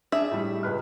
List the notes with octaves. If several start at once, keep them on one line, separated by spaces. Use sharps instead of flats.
D4 G#4 E5
A2 G3
C#2 B4 F6